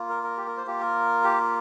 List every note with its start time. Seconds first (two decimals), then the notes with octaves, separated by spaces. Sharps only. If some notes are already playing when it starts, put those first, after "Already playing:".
Already playing: A#3 F4
0.09 A#4
0.23 A#4
0.37 G4
0.47 A#4
0.57 C5
0.67 A#3 F4 G4
0.80 A#4
1.24 G4